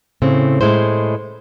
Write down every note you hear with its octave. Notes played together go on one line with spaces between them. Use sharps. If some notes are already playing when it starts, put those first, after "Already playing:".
A2 C#3 C4
A2 G#3 E4 C5